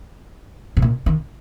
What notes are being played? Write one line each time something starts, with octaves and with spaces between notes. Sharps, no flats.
G#2
A#2
D#3